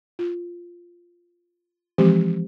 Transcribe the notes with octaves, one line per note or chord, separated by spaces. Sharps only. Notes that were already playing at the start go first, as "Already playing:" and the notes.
F4
E3 F3 G#3 C4 G4